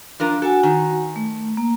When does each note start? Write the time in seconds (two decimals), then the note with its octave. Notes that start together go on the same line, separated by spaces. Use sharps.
0.20 F3 D4 A#4
0.42 F#4 A4 F#5 G#5
0.63 D#3
1.16 A3
1.57 A#3